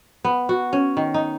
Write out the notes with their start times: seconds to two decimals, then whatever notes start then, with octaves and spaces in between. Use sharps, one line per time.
0.24 B3
0.49 F#4
0.73 C#4
0.97 D#3
1.14 D#4